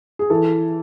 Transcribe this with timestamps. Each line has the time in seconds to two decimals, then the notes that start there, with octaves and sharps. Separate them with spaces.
0.19 G#4
0.30 E3 A4